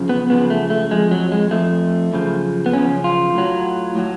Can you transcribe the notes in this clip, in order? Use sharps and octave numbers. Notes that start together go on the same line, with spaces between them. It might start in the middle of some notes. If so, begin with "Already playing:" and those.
Already playing: F#2 C#3 F3
B3
F#2 C#3 F3 B3
A3
A3
F2 F3 G#3
F#3
G#3
F2 F3 A3
F#2 C#3 F3
B3
F#2 C#3 F3 C#4
F4
A2 F#3
A2 F#3